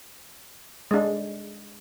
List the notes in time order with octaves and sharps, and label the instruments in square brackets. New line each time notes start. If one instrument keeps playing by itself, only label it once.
[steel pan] G#3 D4